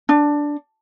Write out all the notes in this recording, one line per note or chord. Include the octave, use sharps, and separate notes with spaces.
D4